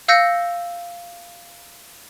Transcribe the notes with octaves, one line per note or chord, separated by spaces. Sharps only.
F5 E6 G6 A#6 C#7